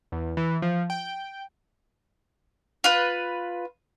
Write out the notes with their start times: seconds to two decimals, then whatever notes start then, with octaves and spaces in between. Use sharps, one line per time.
0.12 E2
0.37 E3
0.62 F3
0.90 G5
2.84 F4 B4